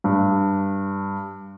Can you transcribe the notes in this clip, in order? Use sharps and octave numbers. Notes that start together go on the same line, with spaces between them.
G2